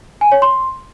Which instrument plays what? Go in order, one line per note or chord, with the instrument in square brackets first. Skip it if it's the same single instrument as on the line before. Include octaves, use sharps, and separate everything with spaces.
[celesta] G#5
C#5
C6